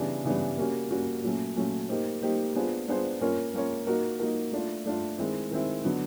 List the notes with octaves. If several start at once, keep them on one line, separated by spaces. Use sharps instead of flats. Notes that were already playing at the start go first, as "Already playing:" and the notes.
Already playing: C#3 E3 G3 B3 D4
C#3 E3 G3 B3 D4
G3 A#3 C#4 F#4
G3 A#3 C#4 F#4
A#2 F#3 A3 C#4
A#2 F#3 A3 C#4
A#3 D#4 G4 C5
A#3 D#4 G4 C5
B3 D4 F4 G#4 C5
B3 D4 F4 G#4 C5
A#3 C#4 F4 A#4 C#5
A#3 C#4 F4 A#4 C#5
A#3 D#4 F#4 A#4
A#3 D#4 F#4 A#4
A3 D4 F4
A3 D4 F4
D#3 G#3 C4 E4
D#3 G#3 C4 E4
D3 F#3 B3